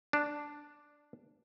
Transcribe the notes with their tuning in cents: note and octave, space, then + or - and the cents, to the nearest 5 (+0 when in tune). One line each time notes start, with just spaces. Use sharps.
D4 +0